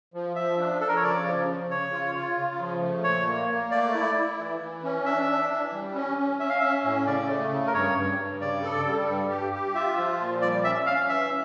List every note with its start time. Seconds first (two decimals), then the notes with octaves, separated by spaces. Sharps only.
0.14 F3
0.36 F3 E5
0.59 D4
0.80 F3 A4
0.88 A#4
0.96 C#5
1.03 C#3 D5
1.26 F3
1.48 C#3
1.70 C#3 C#5
1.93 F4
2.15 F4
2.37 C#3
2.60 F3
2.81 A3
3.04 A#2 C#5
3.27 A#3
3.49 A#3
3.71 A3 D5
3.94 E4
4.16 E4
4.38 E3
4.60 E3
4.84 C#4
5.05 D4 E5
5.28 D4
5.50 E3
5.73 G3
5.94 C#4
6.18 C#4
6.40 C#4 E5
6.50 F5
6.60 C#4 E5
6.84 A2
7.07 C#3 D5
7.28 A3
7.51 C#3
7.67 A#4
7.74 G2 C#5
7.96 G2
8.19 G2
8.41 C#3 D5
8.63 A4
8.86 G3
9.07 G2
9.30 G4
9.53 G4
9.75 F4 E5
9.97 F3
10.19 A#2
10.42 G3 D5
10.64 C#4 E5
10.86 C#4 F5
11.09 E3 E5